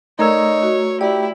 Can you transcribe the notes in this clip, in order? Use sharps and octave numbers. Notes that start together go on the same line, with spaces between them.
A3 D#4 A#4 C#5 D5 A#5 E6 G#6
F#4
E4 G4 D5